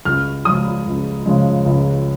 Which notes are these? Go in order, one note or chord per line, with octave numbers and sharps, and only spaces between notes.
C#2 F6
C#3 F3 G#3 D#6
C#2
C#3 F3 G#3
C#2